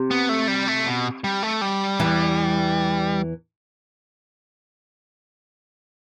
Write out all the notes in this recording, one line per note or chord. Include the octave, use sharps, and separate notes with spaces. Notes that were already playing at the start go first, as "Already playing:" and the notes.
Already playing: C3
B3
A3
G3
A3
B2
G3
A3
G3
E2 E3